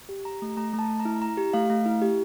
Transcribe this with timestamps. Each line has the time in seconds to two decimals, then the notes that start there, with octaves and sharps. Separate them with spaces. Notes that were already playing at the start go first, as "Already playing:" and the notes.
0.09 G4
0.25 G4 A#5
0.42 A3
0.57 A3 A#5
0.73 A3
0.79 A5
0.89 A3
1.00 A#5
1.05 E4
1.22 E4 A#5
1.37 G4
1.53 A3 F5
1.70 A3
1.86 E4
2.02 G4